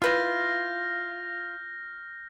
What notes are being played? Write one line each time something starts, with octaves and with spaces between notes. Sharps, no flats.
E4 F4 B4 E5 F6 G6 A#6